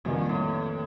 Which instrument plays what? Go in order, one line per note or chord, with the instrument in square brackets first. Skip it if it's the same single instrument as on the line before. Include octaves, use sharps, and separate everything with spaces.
[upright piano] G1 F2 D#3 A#3 [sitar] A#2
[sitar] A2